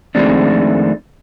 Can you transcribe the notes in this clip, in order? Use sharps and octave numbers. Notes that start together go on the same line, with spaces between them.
F2 D#3 G#3 A3 C4 D4